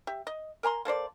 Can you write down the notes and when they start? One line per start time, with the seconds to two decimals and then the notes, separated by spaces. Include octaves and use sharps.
0.07 G4 E5
0.27 D#5
0.63 A#4 G#5 A#5 C6
0.85 A#3 A4 C5 D5